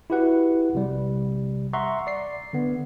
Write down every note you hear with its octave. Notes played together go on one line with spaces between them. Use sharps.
E4 F#4 G4 B4 F#5
A#1 C3 G3
E5 F#5 A#5 C6 C#6
D5 C7
D3 B3